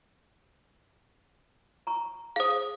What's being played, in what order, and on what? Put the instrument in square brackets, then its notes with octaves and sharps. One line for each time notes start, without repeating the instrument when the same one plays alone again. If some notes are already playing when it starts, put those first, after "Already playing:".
[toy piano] A#5 C#6
[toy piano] G#4 C5 [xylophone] F5 D#6